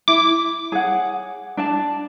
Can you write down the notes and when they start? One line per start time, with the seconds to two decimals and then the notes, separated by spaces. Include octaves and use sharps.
0.08 E4 D6
0.72 G#4 C#5 F#5
1.57 D4 D5 A5